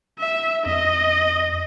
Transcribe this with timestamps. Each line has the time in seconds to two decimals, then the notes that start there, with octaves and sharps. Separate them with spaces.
0.19 E5
0.66 F2 D#5